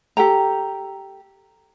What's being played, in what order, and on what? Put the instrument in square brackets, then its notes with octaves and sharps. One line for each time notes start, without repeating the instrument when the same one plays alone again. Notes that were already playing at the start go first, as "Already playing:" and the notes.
[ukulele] G4 A4 G5 A#5